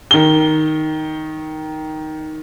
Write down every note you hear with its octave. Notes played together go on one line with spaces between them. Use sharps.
D#3 G7